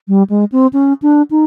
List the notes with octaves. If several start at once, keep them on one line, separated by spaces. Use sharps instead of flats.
G3
G#3
C4
C#4
D4
D#4